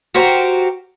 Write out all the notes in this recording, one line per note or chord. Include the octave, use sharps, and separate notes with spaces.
F#4 G4 A#4 C5